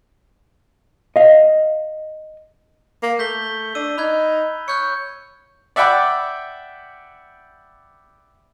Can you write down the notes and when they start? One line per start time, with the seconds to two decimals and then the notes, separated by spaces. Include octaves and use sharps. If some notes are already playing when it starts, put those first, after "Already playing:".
1.16 D#5 F5
3.03 A#3
3.19 A3 G6 B6 G7
3.75 D4 E6 D#7
3.98 D#4 B5 F#6 G#6
4.68 C#5 F#6 G6 C#7
5.76 D5 E5 F#5 G5 B5 D6